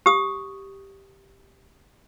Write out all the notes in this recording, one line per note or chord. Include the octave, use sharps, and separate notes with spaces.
G4 D#6